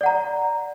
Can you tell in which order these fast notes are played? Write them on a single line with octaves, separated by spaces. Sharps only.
D5 F#5 A#5